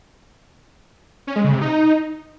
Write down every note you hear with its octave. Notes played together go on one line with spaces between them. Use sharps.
C#4
G#3
C#3
C3
D#4